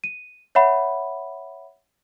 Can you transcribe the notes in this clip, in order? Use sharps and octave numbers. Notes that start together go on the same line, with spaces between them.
D#7
C#5 E5 F#5 B5